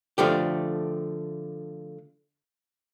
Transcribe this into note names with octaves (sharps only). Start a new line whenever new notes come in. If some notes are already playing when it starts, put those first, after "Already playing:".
D3 F3 A3 G4